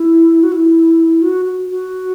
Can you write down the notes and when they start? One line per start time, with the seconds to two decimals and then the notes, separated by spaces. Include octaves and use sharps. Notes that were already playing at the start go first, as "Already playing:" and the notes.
Already playing: E4
0.43 F#4
0.52 E4
1.22 F#4
1.45 F#4
1.70 F#4